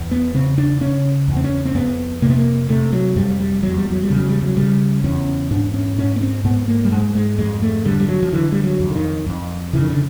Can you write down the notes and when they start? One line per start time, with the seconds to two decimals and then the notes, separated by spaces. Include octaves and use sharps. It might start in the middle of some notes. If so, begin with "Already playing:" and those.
Already playing: E2
0.11 B3
0.34 C#3 C4
0.58 D4
0.81 C#3 C#4
1.28 E2
1.37 C4
1.44 C#4
1.65 C4
1.75 F2 B3
2.22 C3 A#3
2.30 B3
2.37 A#3
2.69 C3 A3
2.93 F#3
3.16 F2 G3
3.40 G3
3.63 E2 F#3
3.77 G3
3.90 F#3
4.03 G3
4.10 C#3
4.16 F#3
4.29 G3
4.42 F#3
4.57 C#3 G3
5.04 E2 C#4
5.51 G#2 D4
5.74 C#4
5.98 G#2 C#4
6.16 B3
6.21 C4
6.45 G#2 B3
6.68 A#3
6.84 G3
6.91 G#2 G#3
7.15 G#3
7.38 F2 G#3
7.62 A3
7.85 D3 G3
8.00 G3
8.08 F#3
8.22 F3
8.32 D3 E3
8.52 G3
8.64 F#3
8.80 F2
8.90 D3
8.95 D#3
9.26 F2
9.73 C#3 E3
9.81 D#3
9.90 D3